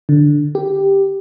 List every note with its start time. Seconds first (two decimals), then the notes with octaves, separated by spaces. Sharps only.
0.09 D3
0.55 G4